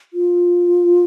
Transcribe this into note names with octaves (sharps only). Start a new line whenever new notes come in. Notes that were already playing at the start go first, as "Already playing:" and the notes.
F4